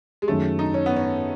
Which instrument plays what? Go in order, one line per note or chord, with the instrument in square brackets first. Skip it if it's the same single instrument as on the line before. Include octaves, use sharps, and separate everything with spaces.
[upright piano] G#3
[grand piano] F#2 D#3 F#3 C#4 G#4 [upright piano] A3
[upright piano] D#4
C#4
B3
C#4